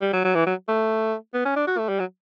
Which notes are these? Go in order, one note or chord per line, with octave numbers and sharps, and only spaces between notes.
G3
F#3
F#3
E3
F#3
A3
B3
C#4
D4
F#4
A3
G3
F#3